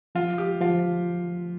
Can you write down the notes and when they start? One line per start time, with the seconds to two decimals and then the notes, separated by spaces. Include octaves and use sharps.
0.15 F3 F4
0.38 G4
0.61 F3 F4